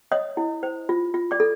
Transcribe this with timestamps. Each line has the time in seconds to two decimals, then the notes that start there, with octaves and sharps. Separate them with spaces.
0.12 C#5 D#5 D#6
0.37 E4
0.63 C5
0.89 F4
1.14 F4
1.31 D5 D6
1.40 A4